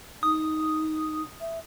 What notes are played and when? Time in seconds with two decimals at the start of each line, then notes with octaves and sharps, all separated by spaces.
0.23 D#4 D#6
1.41 E5